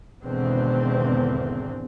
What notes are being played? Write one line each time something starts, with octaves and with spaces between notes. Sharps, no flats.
G#1 E2 B2 D3 C4